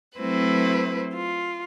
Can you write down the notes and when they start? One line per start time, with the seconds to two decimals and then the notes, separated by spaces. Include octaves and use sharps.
0.18 F#3 A3 C4 E4 B4 C5
1.13 F4